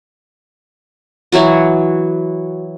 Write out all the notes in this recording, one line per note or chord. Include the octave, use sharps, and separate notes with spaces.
E3 F#3 F#4